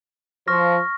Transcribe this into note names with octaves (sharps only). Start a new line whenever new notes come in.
F3 C#6 F6 A#6